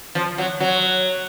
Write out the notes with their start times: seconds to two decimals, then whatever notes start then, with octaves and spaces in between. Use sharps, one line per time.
0.15 F3
0.38 F#3
0.60 F#3